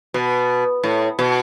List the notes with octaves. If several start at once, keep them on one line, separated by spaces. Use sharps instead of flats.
B2
A2
B2